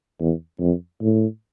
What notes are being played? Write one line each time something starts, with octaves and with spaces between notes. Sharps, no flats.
E2
F2
A2